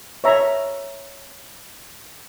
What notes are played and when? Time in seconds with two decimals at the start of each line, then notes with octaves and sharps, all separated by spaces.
0.24 C#5 E5 A#5